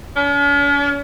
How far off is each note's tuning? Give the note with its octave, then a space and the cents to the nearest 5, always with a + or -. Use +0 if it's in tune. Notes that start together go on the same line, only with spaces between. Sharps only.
C#4 +45